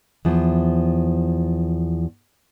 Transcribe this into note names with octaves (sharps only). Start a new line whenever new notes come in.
E2 F3